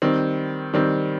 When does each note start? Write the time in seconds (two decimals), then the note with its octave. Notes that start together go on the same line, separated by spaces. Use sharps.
0.02 D#3 G3 C4
0.74 D#3 G3 C4